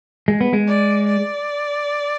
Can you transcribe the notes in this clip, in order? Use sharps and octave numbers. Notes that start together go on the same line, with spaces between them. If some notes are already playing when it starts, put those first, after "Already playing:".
G#3
B3
G#3
D5
D5